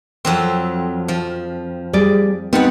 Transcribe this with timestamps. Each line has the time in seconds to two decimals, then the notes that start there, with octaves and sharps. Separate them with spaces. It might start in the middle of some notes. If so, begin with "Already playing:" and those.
0.25 F2 F#3 C4
1.08 F3
1.93 G3 G#4 D5
2.53 G3 B3 C4 D#4 F#5